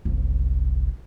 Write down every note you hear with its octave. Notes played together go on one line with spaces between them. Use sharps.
F#1 C2